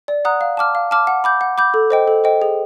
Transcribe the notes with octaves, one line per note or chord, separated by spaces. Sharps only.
D5
F#5 A#5 D#6 F#6
F5
A5 D6 F6
F5
A5 D6 F6
F#5
B5 D6 G6
F#5
B5 D6 G6
A4
C5 D#5 G5
A4
C5 D#5 G5
G#4